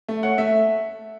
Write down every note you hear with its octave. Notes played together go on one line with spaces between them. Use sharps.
A3
C#5 F#5
A3 E5